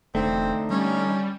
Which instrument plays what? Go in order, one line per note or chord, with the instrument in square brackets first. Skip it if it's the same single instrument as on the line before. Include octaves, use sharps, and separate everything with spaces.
[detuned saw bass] E1 [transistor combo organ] D3 D#4 [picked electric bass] A3 [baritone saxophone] C4
[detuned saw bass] G3 [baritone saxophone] C#4